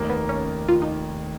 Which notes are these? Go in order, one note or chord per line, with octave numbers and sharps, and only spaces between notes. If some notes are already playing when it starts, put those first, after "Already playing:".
Already playing: F1 D#2 D#3 A#3
B3
C#4
F4
D#4